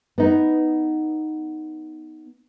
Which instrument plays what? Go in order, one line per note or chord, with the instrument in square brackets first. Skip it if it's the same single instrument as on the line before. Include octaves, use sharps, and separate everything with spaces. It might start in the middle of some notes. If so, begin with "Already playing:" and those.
[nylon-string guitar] B3 D#4